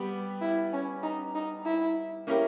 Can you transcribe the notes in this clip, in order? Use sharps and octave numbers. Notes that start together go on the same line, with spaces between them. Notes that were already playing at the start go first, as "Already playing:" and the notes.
Already playing: G3 B3 G4
E4
C#4
D#4
D#4
E4
A#3 C#4 E4 G4 A#4